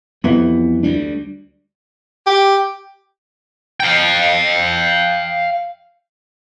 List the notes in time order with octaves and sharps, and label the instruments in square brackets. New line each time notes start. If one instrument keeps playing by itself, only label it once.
[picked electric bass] F2 E3 [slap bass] G3 B3
[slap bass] D2 G3 D4
[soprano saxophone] G4
[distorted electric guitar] F5 G5